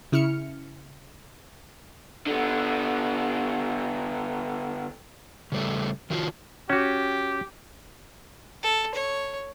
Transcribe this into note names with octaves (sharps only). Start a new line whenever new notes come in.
C#3 E4 F6 C#7
D3 B3
C#3 G3 A3
D#3 F3 F4 F#4
C#4 F#4 G4
A4
C#5